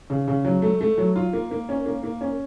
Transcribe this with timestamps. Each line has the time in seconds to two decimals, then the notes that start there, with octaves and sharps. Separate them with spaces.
0.10 C#3
0.28 C#3
0.45 F#3
0.62 A3
0.81 A3
0.98 F#3
1.16 F4
1.33 A#3
1.51 A#3
1.69 C#4
1.86 A#3
2.04 A#3
2.21 C#4